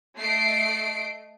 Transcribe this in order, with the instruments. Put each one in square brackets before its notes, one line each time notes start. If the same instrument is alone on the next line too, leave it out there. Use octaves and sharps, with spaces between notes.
[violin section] A3 D#5 C7 D7